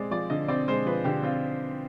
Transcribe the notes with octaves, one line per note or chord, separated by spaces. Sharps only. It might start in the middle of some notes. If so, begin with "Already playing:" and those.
Already playing: G#3 C4 D5
F3 D5
D3 D#5
C4 D5
G#3 C5
F3 B4
D3 G4
C4 F4